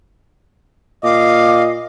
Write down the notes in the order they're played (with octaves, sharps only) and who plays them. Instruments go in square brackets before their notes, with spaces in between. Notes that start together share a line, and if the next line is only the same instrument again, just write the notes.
[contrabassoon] A#2 [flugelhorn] D#5 [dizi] F5 [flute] D6